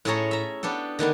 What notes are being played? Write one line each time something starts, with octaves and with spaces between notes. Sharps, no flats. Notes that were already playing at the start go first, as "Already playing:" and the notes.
A2 C#4 G#4 A4 C#5 A#5
E5 A#5
B3 D4 G4 A4
D3 D#3 B3 D4